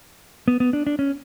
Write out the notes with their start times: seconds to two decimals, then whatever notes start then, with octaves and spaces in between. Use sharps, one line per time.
0.48 B3
0.60 B3
0.73 D4
0.87 D4
0.99 C#4